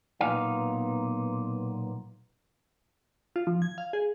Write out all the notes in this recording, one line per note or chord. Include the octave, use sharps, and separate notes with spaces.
B1 A#2 B3 D#4 F5
F4
F3
G#6
F5
G#4